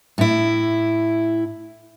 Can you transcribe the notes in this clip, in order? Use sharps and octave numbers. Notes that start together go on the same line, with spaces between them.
A2 E4